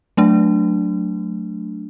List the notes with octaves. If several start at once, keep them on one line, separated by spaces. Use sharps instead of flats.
F#3 A3 D4